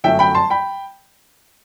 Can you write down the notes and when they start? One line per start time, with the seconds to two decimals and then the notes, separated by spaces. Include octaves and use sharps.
0.04 G1 F#2 F#3 A3 E5 G5
0.19 G5 B5
0.35 A5 C6
0.50 G5 B5